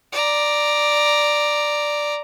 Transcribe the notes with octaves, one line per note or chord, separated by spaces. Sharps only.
D5 A#5